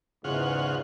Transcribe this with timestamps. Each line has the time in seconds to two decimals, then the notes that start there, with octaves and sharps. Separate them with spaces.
0.24 E2 G#2 C#3 F4 F#5